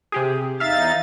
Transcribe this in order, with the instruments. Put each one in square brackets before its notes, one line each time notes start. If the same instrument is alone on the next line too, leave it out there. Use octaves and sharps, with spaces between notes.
[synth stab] C3 G4 G#4
[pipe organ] E2 D#4 A6 [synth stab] E5 F5